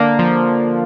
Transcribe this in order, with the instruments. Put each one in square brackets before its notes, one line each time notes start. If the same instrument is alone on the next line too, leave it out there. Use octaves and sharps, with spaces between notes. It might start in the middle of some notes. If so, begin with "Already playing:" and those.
Already playing: [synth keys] D3 A#3 D4
F3